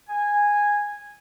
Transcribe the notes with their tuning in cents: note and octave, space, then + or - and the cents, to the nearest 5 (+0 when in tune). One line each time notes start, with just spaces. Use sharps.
G#5 -10